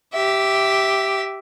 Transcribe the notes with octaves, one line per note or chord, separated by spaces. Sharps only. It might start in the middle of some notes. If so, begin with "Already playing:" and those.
G4 E5